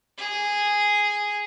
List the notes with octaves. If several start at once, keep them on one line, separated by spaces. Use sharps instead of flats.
G#4